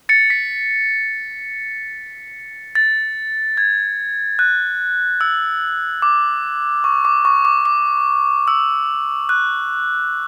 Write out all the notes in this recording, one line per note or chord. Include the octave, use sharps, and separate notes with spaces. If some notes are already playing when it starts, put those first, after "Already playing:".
A6 C#7
B6
A6
G#6
F#6
E6
D6
C#6
D6
C#6
D6
D6
E6
F#6